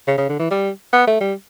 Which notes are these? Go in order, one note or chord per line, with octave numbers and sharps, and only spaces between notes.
C#3
C#3
D3
E3
G3
B3
A3
G3